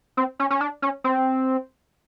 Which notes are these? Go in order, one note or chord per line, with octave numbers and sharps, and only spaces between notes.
C4
C#4
C#4
D4
C#4
C4